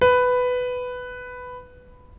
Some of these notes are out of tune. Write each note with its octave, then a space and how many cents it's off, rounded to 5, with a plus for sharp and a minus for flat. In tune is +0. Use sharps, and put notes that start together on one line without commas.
B4 +10